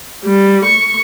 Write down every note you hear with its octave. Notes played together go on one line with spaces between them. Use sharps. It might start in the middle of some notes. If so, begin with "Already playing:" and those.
G3
C#6